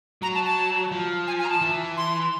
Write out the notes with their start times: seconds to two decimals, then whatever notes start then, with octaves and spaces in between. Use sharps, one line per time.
0.22 F#3 A#5
0.35 A5
0.46 A5
0.91 F3
1.28 G#5
1.39 G#5
1.45 A#5
1.50 A5
1.61 E3
1.97 C6